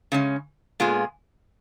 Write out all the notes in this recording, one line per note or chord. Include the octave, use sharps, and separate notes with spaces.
C#3 G#3 C#4
A#2 G#3 B3 F4 G#4